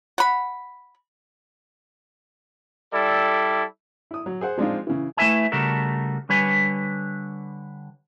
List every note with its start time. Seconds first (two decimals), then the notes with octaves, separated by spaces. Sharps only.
0.18 F#5 B5
2.93 G3 E4 A4 D5
4.11 E4 D#6
4.26 F#3
4.41 G#4 C5 F#5
4.58 F3 G#3 C4 D4 D#4 F4
4.87 C#3 E3
5.17 A3 E4 B4 E5 G#5
5.52 C#3 G3 A3 F#4 A4 A#4
6.29 D3 G3 B4 C#5 G#5